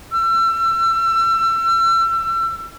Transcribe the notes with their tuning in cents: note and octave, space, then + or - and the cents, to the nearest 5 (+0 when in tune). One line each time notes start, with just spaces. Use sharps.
E6 +35